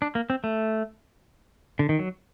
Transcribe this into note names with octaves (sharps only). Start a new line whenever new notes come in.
D4
A#3
C4
A3
D3
D#3
F#3